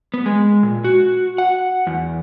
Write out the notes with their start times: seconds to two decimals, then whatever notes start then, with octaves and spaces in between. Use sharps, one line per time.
0.14 B3
0.26 G#3
0.63 A#2
0.84 F#4
1.38 F#5
1.87 E2